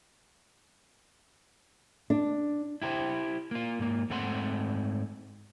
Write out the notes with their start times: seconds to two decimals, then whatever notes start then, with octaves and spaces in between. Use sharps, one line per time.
2.10 D4
2.82 E4 G4 A#4 C5
3.51 A#3 F4
3.79 G#2 A#3
4.10 G#2 A3 C4 F#5 C6